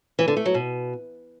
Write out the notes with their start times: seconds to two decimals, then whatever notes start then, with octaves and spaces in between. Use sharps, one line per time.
0.19 E3
0.28 D3
0.37 A3
0.45 F#3
0.54 B2